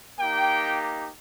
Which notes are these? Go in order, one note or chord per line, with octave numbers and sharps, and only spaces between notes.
A#3 D#4 G4 G5